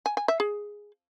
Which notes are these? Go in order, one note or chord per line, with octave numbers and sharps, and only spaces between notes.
G#5
G#5
E5
G#4